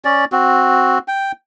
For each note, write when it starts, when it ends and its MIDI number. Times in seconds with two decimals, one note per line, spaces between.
0.05 0.25 61
0.05 0.25 74
0.32 0.98 60
0.32 0.98 66
1.08 1.32 79